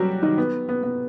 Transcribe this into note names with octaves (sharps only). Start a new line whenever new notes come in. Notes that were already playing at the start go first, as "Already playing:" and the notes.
Already playing: F#3 G3 F#4 G4
D#3 D#4
B3
B3
B3